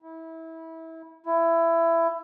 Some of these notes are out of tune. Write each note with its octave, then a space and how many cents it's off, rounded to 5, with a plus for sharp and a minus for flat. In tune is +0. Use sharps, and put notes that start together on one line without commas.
E4 -25
E4 +20